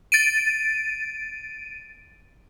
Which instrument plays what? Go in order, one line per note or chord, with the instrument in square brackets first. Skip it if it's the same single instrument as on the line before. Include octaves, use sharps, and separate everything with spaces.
[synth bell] A6 D7 D#7